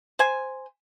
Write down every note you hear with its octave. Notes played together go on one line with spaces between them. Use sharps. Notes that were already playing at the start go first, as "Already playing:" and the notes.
C5 G#5